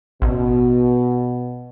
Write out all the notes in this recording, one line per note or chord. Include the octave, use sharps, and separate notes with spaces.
A1 B2